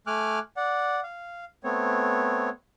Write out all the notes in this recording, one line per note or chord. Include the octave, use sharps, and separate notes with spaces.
A3 G#5 D6 F6 F#6
D5 F#5
F5
A3 B3 C4 C#5